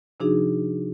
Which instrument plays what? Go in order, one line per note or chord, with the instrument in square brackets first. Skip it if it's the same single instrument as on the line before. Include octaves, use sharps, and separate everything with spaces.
[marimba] C3 F3 D4 D#4 F#4 G#4